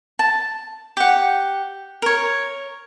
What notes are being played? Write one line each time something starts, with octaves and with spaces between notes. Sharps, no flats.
A5
G4 F#5
A#4 C#5